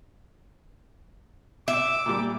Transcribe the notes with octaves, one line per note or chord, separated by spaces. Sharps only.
E5 D6
A#2 G3